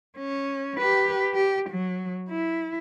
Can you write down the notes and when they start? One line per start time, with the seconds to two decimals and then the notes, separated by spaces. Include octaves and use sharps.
0.18 C#4
0.78 G4 B4
1.34 G4
1.70 F#3
2.29 E4